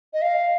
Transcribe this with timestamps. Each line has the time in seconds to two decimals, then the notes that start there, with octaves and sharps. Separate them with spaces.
0.13 D#5
0.22 F5